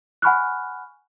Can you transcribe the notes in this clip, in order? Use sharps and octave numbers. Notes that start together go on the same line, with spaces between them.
F#5 G#5 B5 C#6 F6 F#6